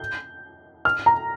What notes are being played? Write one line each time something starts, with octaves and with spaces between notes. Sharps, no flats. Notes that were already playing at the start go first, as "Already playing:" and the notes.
Already playing: G6
F6
A#5